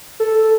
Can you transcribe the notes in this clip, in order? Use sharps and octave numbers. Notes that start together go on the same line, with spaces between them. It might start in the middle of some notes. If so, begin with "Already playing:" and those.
A4